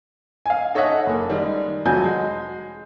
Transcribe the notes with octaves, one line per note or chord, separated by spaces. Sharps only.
F5 G#5
D#4 A4 C#5 D#5 E5 F#5
F#1 A#3
D#3 G3 G#3
F1 F2 F#3 F#4 G#5 G6
G#3